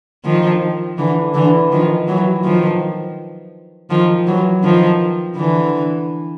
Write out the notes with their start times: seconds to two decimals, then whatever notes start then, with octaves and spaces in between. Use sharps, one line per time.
0.25 D#3 F3
0.98 D3 E3
1.34 D3 E3
1.72 D#3 F3
2.08 E3 F#3
2.44 D#3 F3
3.90 D#3 F3
4.27 E3 F#3
4.64 D#3 F3
5.37 D3 E3